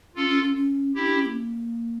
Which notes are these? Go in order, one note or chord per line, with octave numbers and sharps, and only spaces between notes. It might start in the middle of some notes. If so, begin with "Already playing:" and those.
C#4 F4 A4
C#4
C#4
C#4
D4 E4 G4
D4
C#4
A#3